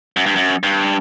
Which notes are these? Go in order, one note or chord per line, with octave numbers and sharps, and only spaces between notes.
F#2
G2
F#2
G2